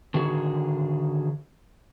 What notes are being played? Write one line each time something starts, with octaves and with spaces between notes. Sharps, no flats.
D3 D#3 F#4 G#4